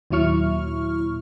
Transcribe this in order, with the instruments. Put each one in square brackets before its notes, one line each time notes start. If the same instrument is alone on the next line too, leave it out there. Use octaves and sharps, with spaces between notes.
[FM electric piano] D#2 A#2 F#3 E4 C#6 F6